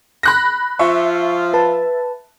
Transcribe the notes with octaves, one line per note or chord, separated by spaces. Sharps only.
B5 F#6 A#6
F3 F4 E5 C#6
B4 A5